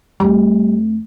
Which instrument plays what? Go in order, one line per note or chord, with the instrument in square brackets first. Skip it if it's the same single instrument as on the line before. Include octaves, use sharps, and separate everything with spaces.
[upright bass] F2 A3 [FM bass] G3